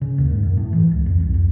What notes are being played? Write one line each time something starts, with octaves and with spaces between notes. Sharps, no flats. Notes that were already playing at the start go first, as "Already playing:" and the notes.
C#3
D#2
G#2
F#2
A2
E3
C#2
F2
C2
F2